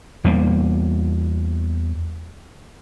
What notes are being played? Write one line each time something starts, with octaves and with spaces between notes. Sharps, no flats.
E2 G3 G#3 A#3